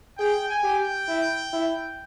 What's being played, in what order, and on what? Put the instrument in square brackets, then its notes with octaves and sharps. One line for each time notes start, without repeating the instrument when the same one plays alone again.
[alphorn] G#4 [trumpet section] G5
[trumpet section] G#5
[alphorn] G4
[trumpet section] G5
[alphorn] E4
E4